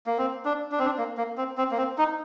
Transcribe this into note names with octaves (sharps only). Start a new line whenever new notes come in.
A#3
C4
D4
D4
C4
D4
A#3
A#3
C4
C4
A#3
C4
D#4